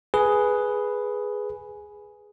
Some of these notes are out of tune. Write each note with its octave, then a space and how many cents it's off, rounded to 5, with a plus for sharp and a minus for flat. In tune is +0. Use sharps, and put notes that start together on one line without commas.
G#4 +5 B4 +0